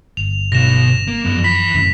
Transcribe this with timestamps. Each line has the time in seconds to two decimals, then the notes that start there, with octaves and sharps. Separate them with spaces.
0.17 G1 F7
0.52 B1 B2 A#6 E7
1.07 A#3
1.25 F#2 F3 B3
1.44 E3 B5 B6
1.74 F#2 A2 C#3